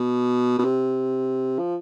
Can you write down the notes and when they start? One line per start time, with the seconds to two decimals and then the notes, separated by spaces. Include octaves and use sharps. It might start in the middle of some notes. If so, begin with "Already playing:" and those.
Already playing: B2
0.59 B2
0.64 C3
1.59 F3